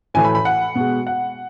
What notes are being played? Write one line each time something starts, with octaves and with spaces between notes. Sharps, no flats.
A2 E3 A3 G#5
B5
B5
F#5
B2 G#3
F#5